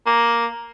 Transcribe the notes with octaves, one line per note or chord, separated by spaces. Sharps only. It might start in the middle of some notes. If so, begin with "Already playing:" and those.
A#3